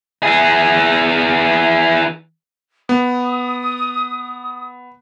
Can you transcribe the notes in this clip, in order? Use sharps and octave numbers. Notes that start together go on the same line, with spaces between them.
E3 G#4
B3 D#6